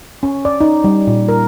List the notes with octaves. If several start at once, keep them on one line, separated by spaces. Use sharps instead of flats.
C#4
D5
D#4
G3
A#2
A#4